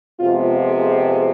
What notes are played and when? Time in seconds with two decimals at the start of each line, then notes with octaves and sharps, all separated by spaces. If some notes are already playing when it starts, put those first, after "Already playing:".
0.19 F2 C3 G#3 B3 F4
0.64 G#4